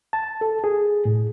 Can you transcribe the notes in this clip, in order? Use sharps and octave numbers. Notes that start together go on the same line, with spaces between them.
A5
A4
G#4
A2